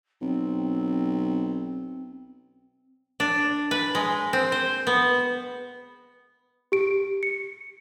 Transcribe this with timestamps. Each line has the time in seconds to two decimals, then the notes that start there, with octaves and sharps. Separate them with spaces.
0.21 B1 C4
3.20 D4
3.71 B4
3.95 G#3
4.33 C4
4.52 C5
4.87 B3
6.72 G4 D7
7.23 C#7